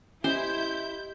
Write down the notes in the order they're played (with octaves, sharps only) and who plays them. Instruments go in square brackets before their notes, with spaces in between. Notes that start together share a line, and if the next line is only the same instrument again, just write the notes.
[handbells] C#4 [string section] E4 G6 [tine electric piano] G4 D#5 [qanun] C5